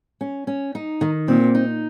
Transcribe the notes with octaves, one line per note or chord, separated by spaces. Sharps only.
C#4
C#4
D#4
D#3
A#2 C4
D#4